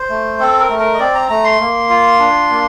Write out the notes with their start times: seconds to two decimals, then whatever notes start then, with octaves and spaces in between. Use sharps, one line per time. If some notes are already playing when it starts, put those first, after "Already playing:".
Already playing: C5
0.09 A3
0.39 C4 A4
0.60 A#4
0.69 A3
0.79 A#4
0.94 D#5
0.99 C4 D5
1.15 A#5
1.29 A3 A#5
1.44 C6
1.60 A#3
1.90 F4
2.19 D4
2.49 A#3